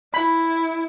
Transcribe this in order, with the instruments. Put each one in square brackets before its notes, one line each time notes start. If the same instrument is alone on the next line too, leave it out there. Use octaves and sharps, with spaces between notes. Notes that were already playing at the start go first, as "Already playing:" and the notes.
[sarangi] E4 [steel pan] B5